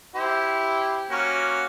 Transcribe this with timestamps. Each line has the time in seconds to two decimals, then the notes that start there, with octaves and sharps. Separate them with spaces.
0.15 E4 G4 C5
1.11 A#3 C#4 F#4